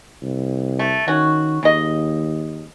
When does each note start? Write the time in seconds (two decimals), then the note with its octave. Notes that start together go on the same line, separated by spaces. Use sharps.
0.22 C2
0.79 A3
1.08 D#3 C#4 F#4
1.63 D#2 C#3 D#5